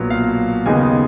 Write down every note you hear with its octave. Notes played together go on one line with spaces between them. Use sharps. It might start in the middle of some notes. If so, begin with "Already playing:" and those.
Already playing: B1 A#2 F#3 B3
F5
D#2 C#3 G#3 B3 D#4 G#5